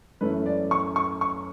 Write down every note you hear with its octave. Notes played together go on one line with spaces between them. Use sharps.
F#2 E3 A3 C#4 B4
D5
C#6
C#6
C#6